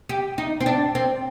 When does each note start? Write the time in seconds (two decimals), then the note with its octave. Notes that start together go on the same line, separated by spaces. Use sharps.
0.09 G4
0.38 D#4
0.60 C4
0.66 D4
0.95 C4